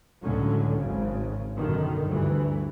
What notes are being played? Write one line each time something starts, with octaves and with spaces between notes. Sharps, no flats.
C#2 A2 D3 F#3 C#4
G#1 G#2 C#3
F#2 B2 D3 D#3
D2 G2 E3